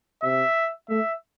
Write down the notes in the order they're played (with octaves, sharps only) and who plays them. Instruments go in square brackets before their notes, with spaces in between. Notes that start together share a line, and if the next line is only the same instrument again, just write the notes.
[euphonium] C3 [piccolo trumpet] E5
[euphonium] A3 [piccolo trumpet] E5